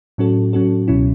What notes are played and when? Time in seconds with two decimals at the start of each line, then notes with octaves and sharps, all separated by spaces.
0.18 A2 F#3 C#4 F#4 A4
0.53 A2 F#3 C#4 F#4 A4
0.88 C#2 B2 F#3 C#4 E4